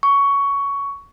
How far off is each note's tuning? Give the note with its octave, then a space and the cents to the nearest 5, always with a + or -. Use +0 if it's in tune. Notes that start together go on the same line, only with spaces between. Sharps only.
C#6 +15